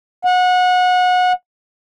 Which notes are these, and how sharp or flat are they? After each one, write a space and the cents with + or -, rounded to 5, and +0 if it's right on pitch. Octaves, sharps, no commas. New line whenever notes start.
F#5 -25